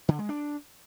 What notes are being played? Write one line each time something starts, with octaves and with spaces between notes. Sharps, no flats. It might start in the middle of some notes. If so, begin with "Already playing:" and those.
D3
G#3
D4